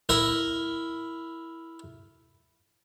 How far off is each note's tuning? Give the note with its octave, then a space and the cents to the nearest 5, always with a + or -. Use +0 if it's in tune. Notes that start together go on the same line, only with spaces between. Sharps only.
E4 +0 A#4 +0